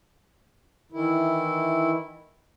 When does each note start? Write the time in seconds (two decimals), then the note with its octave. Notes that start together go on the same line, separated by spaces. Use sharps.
0.92 D#3 E3 E4